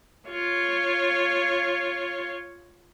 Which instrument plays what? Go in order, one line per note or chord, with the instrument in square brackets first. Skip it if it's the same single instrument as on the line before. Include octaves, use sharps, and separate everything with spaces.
[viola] F4 C#5